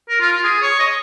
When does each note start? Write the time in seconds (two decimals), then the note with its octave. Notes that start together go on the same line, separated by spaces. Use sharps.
0.09 A#4
0.21 F4
0.33 F4
0.44 G#4
0.62 C#5
0.79 D#5